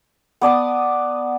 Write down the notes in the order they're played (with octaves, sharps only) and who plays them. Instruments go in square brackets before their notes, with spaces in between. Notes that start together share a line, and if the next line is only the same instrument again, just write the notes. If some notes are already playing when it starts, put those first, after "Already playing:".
[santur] B3 D5 A5 D#6